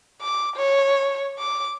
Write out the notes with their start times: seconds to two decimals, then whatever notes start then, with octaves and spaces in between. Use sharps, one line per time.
0.22 D6
0.56 C#5
1.39 D6